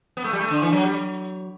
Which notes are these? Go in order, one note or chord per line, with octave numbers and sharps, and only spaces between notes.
B3
A3
G3
A3
D3
E3
F#3
G3
F#3